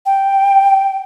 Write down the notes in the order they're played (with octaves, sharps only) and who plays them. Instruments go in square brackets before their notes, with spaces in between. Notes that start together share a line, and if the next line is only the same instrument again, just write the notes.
[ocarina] G5